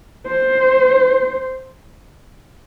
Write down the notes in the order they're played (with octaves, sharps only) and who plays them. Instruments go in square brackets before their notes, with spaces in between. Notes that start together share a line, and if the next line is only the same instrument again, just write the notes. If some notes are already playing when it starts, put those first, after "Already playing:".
[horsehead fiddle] C5